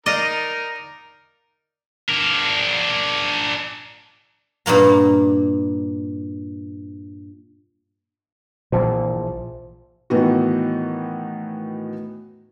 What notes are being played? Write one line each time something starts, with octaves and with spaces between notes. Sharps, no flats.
D#4 A#4 D5 D#5 F5
D4 A#4
G2 A#2 A#3 A#5
A#1 A#2 E3 F3 C5
A2 D#3 E3 B3 F#4